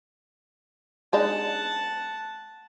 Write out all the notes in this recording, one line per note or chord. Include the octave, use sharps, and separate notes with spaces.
G#3 D4 D#4 F#5 A5